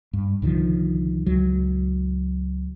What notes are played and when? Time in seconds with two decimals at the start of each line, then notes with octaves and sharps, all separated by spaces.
0.13 G2
0.42 C2 D3 D#3 F3
1.26 C#2 F#3